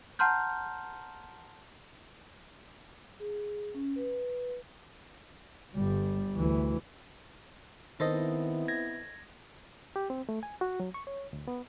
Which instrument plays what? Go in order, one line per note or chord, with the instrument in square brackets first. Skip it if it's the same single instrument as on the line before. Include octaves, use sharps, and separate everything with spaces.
[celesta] F#5 A5 A#5 C6 F6 G6
[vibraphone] G#4
C#4
B4
[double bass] G1 G3
D2 E3
[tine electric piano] D#3 [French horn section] B3 C4 E4 [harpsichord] A4 C5 D#5
[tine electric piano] G#6 A#6
[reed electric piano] G4
C4
A3
G#5
F#4
F#3
C#6
C#5
D2
B3